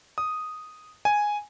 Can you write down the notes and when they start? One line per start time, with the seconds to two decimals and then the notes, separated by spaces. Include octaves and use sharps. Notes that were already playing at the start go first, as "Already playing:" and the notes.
0.18 D#6
1.05 G#5